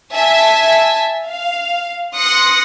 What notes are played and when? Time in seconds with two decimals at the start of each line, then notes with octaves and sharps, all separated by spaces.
0.14 E5 G#5 A5
1.27 F5
2.15 C6 D#6 F#6 A#6 C#7